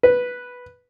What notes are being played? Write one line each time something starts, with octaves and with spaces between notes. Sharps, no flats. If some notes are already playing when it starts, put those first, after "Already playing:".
B4